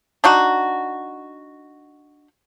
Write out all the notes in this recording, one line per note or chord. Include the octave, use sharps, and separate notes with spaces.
D4 D#4 F#4